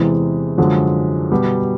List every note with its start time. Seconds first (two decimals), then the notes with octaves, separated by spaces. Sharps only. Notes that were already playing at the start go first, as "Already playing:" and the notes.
Already playing: E2 C3 E3 G#3
0.58 F#2 D3 F3 G#3
1.31 B2 G3 B3